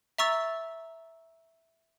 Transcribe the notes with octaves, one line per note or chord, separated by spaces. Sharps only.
E5 A#5 C#6 E6 A6